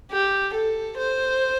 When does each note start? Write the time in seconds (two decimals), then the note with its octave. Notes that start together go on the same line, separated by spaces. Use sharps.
0.11 G4
0.54 A4
0.97 C5